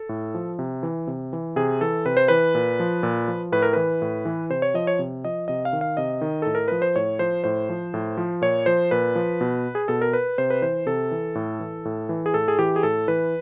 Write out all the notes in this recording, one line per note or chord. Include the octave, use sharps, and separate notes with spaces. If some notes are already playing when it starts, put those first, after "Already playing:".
Already playing: A4
A2
F3
C3
E3
C3
E3
C3 G#4
E3 A4
C3 B4
C5
E3 B4
A#2
F3
A#2
F3
A2 B4
A#4
E3 B4
A2
E3
C3 C5
C#5
F3 D#5
C#5
C3
F3 D#5
C3 D#5
F5
D#3
F5
C3 D#5
D#3
A2 A4
A#4
F3 B4
C5
A2 C#5
F3 C5
A2 C5
F3
A2
F3
A#2 C#5
F3 C5
A#2 B4
F3
B2
G#4
B2 A4
A#4
B4
C3 C5
B4
E3 C5
C3 A4
E3
A2
E3
A2
E3
G#4
A2 A4
G#4
E3 G4
G#4
A2 A4
E3 B4